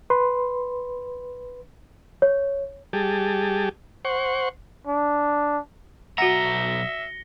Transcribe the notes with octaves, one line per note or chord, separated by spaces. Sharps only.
B4 C6
C#5
G3 G4 G#4 A5
C5 F#5 C#6
D4
B1 F#4 E5 F#5 A#5 A#6 C#7 G7